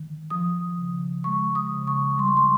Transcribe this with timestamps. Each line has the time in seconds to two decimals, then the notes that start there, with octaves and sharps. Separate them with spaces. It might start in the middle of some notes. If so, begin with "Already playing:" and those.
Already playing: D#3
0.30 F3 D#6
0.78 C#3
1.24 G#3 C#6
1.55 D#6
1.72 C#3
1.87 C#6
2.18 G3 C6
2.28 C#6
2.37 C6